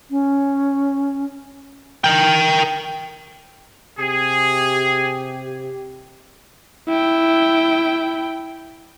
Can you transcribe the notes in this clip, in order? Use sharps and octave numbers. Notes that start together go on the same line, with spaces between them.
C#4
A#4 G5
C3 G4 G#4
E4 G5